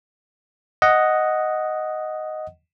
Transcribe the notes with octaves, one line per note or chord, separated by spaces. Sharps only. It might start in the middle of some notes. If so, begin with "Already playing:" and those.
D#5 F#5